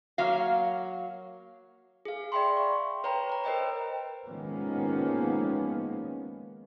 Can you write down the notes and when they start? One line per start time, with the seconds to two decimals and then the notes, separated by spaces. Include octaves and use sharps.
0.18 F#3 A#3 F5
2.05 G#4 F5
2.32 D5 E5 G5 B5 C6
2.57 C#6
3.04 B4 C#5 G5 A#5 B5
3.30 B4 A#5
3.44 A#4 C5 D#5 G5 A#5
4.26 D#3 F3 G#3 A#3 B3 C#4